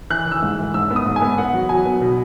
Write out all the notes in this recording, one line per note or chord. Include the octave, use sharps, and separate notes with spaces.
E3 F#6
E3
E6
G#2
E3
G#2 E6
B3
D#6
G#2
G#5
B3
B3 F#5
F#3
F#3 G#5
B3
B2